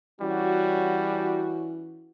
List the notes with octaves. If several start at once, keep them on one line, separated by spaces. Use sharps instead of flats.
E3 G3 C#4 F#4